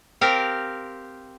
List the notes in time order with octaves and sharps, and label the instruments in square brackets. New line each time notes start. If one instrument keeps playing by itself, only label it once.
[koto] C4 G4 A#4 F5